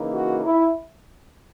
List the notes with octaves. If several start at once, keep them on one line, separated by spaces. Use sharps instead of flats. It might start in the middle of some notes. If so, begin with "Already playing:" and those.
Already playing: C#3 E3 A#3 D#4
F#4
E4